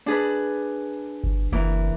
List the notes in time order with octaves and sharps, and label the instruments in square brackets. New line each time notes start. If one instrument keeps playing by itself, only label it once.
[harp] D4 G#4 B4
[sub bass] G1
[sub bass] F#1 [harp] E3 A#3